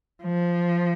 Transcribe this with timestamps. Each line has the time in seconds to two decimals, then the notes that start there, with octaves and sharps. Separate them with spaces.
0.23 F3